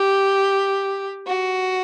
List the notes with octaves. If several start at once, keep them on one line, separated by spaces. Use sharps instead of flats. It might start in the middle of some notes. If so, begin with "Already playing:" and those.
Already playing: G4
F#4